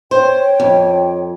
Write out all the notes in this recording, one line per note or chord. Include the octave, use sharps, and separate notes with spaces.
C5 C#5 G5
F2